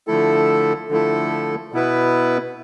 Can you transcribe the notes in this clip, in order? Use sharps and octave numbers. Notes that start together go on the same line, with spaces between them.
D3 F3 A3 E4 A4
D3 F3 A3 E4 A4
B2 B3 E4 B4